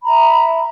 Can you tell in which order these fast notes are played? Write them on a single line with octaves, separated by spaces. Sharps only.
B5 A#5 E5